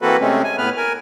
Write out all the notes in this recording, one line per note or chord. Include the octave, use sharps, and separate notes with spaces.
E3 A#3 C4 F#4 A4 B4
C3 G#3 A3 C4 C#4
G#5
A2 B3 B4 F6
A#4 G#5